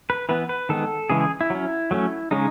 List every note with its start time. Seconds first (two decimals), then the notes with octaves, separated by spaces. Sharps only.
0.10 B4
0.29 E3 B3 B4
0.49 B4
0.69 D#3 G#3 B3 A4
1.10 C#3 E3 G#3 G#4
1.20 G#4
1.41 E4
1.50 F#3 C#4
1.91 F#3 A3 C#4
2.31 C#3 G#3 C#4 D#4